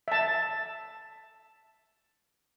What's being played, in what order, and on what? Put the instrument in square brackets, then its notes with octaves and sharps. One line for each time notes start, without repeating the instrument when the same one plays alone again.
[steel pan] E5 A5